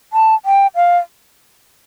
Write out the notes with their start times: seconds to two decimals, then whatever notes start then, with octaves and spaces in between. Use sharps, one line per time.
0.13 A5
0.45 G5
0.75 F5